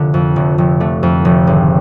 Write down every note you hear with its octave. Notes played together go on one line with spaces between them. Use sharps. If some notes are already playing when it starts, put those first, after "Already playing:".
Already playing: F1 D3 A#3
F2
F1
F1
D3 A3
F2
F1
G#1